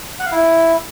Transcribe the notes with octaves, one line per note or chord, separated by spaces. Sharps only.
F#5
F5
E4